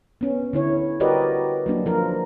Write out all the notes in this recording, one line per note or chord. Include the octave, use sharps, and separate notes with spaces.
B3 C#4
D3 E4 C#5
F#4 G4 A#4 B4 D5 D#5
F#3 A#3 D4
F3 F4 A#4